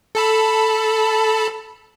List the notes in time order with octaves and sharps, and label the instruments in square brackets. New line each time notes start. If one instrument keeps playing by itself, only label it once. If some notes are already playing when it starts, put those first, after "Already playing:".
[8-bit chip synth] A4 A5 B5